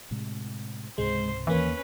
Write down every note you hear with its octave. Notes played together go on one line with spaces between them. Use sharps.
A2 C3 G#3
C#2 G#2 C3 G#3 C5
D#2 E3 A#3 C#4 B4